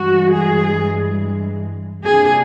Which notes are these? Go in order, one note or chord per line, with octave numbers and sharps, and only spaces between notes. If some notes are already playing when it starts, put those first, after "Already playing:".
Already playing: G2 E3 G#3 F#4
G#4
C3 F3 A#3 D4 G#4